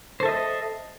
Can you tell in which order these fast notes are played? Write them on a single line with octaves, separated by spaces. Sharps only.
C5 A4 E5 D#5